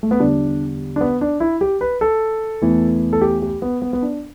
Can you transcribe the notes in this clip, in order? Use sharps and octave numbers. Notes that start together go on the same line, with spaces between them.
A3
B3
E2 D3 G3 D4
D4
B3
D4
E4
G4
B4
A4
E2 E3 A3
A4
G4
G4
B3
B3
B3
D4